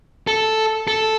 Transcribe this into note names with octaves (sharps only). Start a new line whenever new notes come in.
A4
A4